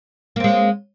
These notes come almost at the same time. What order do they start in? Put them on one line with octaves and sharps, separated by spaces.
A#3 C4 G#3